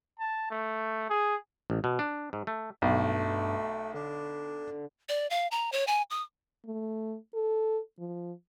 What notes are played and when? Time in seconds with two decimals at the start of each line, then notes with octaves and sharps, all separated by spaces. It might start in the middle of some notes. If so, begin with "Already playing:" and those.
0.19 A5
0.51 A3
1.10 G#4
1.70 A1
1.84 B2
1.99 D4
2.33 G#2
2.47 A3
2.82 B1 G2 A3
3.94 D3 D4
5.09 D5
5.30 F5
5.51 A#5
5.72 C#5
5.87 G#5
6.10 D#6
6.65 A3
7.34 A4
7.99 F3